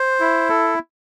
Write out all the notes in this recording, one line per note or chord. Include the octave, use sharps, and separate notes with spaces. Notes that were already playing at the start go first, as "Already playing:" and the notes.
Already playing: C5
E4
A4